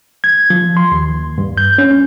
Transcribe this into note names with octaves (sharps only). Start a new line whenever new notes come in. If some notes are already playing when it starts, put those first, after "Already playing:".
G#6
F3
C6
D#2
G2
G6
C#4